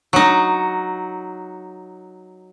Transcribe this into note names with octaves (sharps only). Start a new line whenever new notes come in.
F#3 D#4